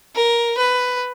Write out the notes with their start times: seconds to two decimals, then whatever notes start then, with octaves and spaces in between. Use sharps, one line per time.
0.15 A#4
0.58 B4